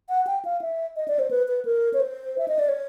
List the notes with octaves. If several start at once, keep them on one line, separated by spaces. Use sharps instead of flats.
F#5
G5
F5
E5
D#5
D5
C5
B4
B4
A#4
C#5
C5
E5
D#5
D5
C#5